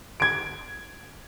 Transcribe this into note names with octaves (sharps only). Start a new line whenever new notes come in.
G#6 D7